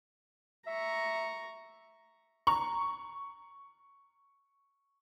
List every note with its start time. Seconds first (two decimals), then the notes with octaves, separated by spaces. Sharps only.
0.67 E5 A#5 C#6
2.47 A#5 C#6